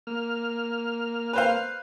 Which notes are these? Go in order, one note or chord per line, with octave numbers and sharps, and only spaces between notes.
A#3 F6
B4 C5 F5